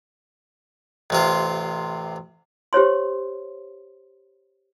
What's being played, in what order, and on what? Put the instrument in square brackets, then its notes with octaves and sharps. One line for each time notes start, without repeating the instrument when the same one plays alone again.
[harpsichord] A1 C3 F4
[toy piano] G4 C5 C#5 C6